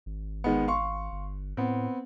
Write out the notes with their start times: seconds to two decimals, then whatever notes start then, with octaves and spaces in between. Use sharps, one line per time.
0.06 G#1
0.44 D#3 G#3 B3
0.67 F5 C6 C#6
1.12 G1
1.57 A2 B3 C4